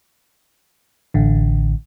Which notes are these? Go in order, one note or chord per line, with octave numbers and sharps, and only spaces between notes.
A1 D3